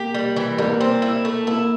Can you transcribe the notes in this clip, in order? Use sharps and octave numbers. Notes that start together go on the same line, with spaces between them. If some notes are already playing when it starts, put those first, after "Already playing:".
Already playing: A#3 G4
G3
E3
G3 A#3
C4
E4
A3
A#3 E4